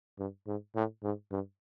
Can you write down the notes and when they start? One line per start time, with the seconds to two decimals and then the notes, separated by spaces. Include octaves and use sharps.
0.19 G2
0.47 G#2
0.75 A2
1.03 G#2
1.31 G2